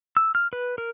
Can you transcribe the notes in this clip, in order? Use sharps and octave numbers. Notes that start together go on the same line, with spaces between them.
E6
F6
B4
A#4